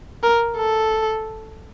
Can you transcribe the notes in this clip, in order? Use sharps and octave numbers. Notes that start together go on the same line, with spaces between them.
A#4
A4